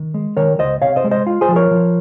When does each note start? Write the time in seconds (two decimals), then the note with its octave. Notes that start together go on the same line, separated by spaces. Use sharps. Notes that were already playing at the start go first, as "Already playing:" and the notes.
Already playing: D#3
0.14 G#3
0.37 D#3 A#4 C#5
0.59 C#2 C5 D#5
0.82 C3 C#5 F5
0.96 C5 D#5
1.04 G#3
1.11 C5 D#5
1.27 F4
1.41 G#4 C5
1.49 F3
1.56 A#4 C#5
1.71 F3